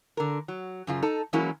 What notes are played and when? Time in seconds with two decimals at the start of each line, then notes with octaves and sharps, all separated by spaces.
0.17 D3 A#4
0.48 F#3
0.87 F#2 C#3 F4
1.02 D#4 A4
1.33 E3 F#3 G#3 A#3 C#4 E4